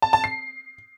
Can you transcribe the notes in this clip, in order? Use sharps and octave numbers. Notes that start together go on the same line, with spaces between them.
A5
A5
C7